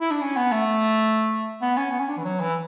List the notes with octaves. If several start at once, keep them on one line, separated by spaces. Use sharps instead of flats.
E4
D4
C#4
B3
A3
B3
C#4
B3
C#4
D4
E3
F#3
E3